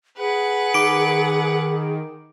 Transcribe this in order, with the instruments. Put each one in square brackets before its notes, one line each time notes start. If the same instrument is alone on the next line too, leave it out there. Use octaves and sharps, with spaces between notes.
[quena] G#4 [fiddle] B4 F#5
[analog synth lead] D#3 [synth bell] D6 D7